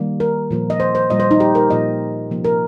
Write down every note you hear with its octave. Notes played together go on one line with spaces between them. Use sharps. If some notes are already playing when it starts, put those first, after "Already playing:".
Already playing: D#3 G3 A#3
A#4
A#2 F3 A#3
D#5
C5
C5
A#2 G3 A#3 D#5
C5
D#4
G4
A#4
A#2 F3 A#3 D#5
C3 F3 A#3
A#4